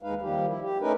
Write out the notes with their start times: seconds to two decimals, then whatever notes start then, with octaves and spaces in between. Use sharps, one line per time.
0.03 D#2 G#3 D#4 B4 F5
0.22 D#3 F3 G3 A#3 G4
0.48 E4
0.62 G4
0.81 A3 C#4 D#4 A#4 B4